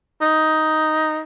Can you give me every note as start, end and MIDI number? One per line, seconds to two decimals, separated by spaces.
0.21 1.20 63